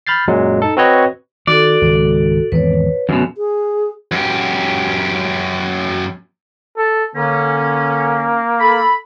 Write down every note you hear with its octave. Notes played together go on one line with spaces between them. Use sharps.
B5 F6 G6 A6 C7
F#2 A#2 F#3 G#3
D#4 A4
C4 F#4 B4 C#5 D#5
D#3 F#4 A4 D5
G#1 C#2
G#1 E2 B4 C#5
F#2 B2 D3
G#4
F#2 G4
A4
D3 A#3 C#4
A4 B5